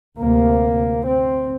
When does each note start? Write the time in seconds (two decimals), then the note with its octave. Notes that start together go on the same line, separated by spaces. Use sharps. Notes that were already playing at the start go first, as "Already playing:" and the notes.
0.19 D2 C3 A#3
1.06 C4